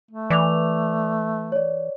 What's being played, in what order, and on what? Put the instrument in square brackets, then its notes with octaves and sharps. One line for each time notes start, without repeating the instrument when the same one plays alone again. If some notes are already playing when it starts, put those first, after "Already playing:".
[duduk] A3
[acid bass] E3 [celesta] D5 D6 F7
[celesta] C#5 D5